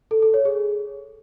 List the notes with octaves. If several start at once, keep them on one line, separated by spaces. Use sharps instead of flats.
A4
A4
C#5
G#4